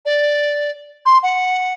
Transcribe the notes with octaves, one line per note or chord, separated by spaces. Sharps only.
D5
C6
F#5